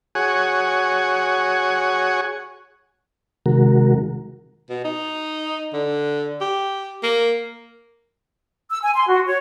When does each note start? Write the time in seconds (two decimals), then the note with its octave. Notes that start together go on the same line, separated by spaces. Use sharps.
0.15 F#4 G#4 C#5
3.46 C3 D#3 G#3 F#4 A#4
4.69 B2
4.84 D#4
5.73 D3
6.41 G4
7.03 A#3
8.70 E6
8.83 G#5
8.95 C6
9.09 F#4
9.26 C#5